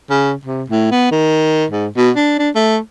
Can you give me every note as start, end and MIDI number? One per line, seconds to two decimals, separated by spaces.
0.10 0.32 49
0.45 0.63 48
0.70 0.89 45
0.91 1.09 59
1.12 1.65 51
1.71 1.87 44
1.97 2.10 47
2.16 2.35 62
2.39 2.50 62
2.55 2.78 57